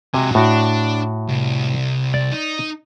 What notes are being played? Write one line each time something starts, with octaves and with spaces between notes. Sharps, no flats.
C3 F#3 G#3 G#5
A2 D4 F#4
C2
D5
D#4